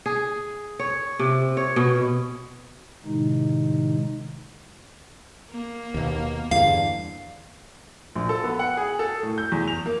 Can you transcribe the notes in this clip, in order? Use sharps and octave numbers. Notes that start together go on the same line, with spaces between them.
G#4
C#5
C3
C#5
B2
A2 C3 D#3 G#3 D#4
A#3
D#2 B2
E2 G2 D3 F5
A#1
A4
B3
F#5
G#4
A4
A2
G6
E2
F7
A#3